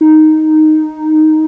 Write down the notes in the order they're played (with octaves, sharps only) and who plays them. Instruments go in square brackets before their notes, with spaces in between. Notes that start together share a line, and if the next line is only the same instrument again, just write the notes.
[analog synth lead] D#4